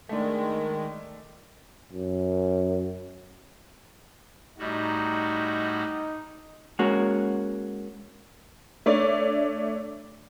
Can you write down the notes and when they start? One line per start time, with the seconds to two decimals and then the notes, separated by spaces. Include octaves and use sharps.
0.09 D#3 G#3 A3 D4
1.93 F#2
4.59 A2 G3 D#4 F#4
6.79 G#3 A#3 C#4 F#4
8.86 A3 D4 C#5 D5